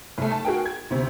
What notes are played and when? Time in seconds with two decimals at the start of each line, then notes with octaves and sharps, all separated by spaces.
0.18 C2 A3
0.31 A5
0.45 F#4 G#4 A#4 G5
0.65 G#6
0.90 D2 C3